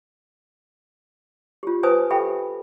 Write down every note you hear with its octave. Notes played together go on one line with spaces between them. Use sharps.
F4 G4
B4 C5 G#5 A5 D#6
G4 A4 E5 G5 B5